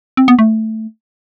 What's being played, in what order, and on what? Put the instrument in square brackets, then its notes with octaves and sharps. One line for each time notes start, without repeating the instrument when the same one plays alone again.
[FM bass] C4
B3
A3